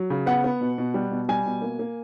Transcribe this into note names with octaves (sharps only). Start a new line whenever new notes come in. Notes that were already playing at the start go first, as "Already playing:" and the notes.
Already playing: F#3
C#3
B3 F#5
B3
B2
B2
G3
B2
G3 G#5
B2
A#3
A#3